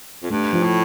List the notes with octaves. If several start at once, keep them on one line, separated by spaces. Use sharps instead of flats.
F2
G2 A3
F3
A2